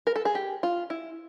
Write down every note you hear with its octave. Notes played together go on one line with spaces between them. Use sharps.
A#4
A4
G#4
G4
F4
E4